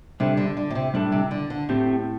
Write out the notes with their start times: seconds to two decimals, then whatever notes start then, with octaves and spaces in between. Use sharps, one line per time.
0.20 C3 G3 D4 A4
0.37 D3
0.57 D3
0.70 A2
0.75 C3
0.94 A2 G3 D4 A4
1.12 C3
1.31 D3
1.50 D3
1.69 A2 A3 C4 G4